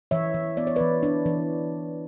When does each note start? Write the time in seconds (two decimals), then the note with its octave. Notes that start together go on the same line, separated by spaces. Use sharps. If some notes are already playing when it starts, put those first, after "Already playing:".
0.11 E3 C#5 E5
0.34 E3
0.57 B3 D5
0.67 C#5
0.76 E3 B4 D5
1.03 D4
1.26 E3